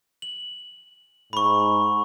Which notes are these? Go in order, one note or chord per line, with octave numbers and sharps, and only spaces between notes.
F#7
G#2 B5 C#6